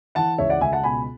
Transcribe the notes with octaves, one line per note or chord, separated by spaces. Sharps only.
E3 F#5 A5
C#2 C#5 E5
D5 F#5
C#2 E5 G#5
F#5 A5
B2 G#5 B5